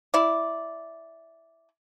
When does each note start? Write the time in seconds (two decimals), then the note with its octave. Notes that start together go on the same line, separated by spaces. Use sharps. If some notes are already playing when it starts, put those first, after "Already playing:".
0.14 E4 D5